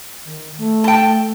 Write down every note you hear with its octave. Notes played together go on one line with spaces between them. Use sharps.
D#3
A3
G5 A5